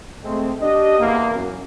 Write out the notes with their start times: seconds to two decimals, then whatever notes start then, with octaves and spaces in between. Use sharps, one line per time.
0.24 G#3 A3 C4
0.61 D4 G4 D#5
1.00 E2 A#3
1.34 F#2